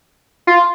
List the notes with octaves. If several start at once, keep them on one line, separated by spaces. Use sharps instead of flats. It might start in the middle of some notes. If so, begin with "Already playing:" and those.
F4